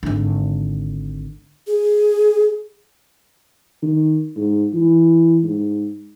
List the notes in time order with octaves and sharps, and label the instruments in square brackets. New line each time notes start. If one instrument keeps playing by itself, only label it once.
[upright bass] G#1 D3
[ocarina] G#4
[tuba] D#3
G#2
E3
G#2